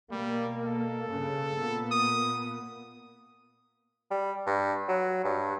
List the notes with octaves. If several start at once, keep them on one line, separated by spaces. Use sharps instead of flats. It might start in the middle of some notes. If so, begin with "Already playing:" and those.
B2 G3 A#3
A4
G2 C#3
A#2 A#3 B3
D#6
G3
G2
F#3
G2